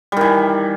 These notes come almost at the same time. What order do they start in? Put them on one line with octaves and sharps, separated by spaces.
G3 D#3 E3